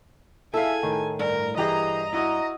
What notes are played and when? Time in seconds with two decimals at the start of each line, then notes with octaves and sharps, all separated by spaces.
0.54 E4 G#4 A4 E5 F5 G#5
0.83 A2 D#3
1.19 G2 A#4
1.57 E3 G4 G#4 D#5 A#5
2.13 E4 F#4 D#5